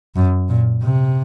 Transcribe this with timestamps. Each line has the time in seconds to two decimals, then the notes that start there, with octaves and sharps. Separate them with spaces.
0.16 F#2
0.49 A#2
0.82 C3